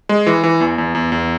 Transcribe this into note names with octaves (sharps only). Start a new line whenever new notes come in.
G#3
E3
E3
E2
E2
E2
E2